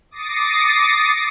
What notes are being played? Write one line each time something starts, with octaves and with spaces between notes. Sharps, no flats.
D6 D#6 A6 A#6 C7 C#7